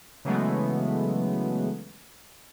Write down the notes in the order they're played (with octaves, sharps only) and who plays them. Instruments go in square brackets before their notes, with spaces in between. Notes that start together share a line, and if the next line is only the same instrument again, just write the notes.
[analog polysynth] C#3 E3 F#3 G#3 A3 B3